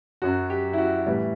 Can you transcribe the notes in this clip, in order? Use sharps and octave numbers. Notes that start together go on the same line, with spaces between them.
F#2 F#3 F#4
G4
E4
F#4
A2 E3 G3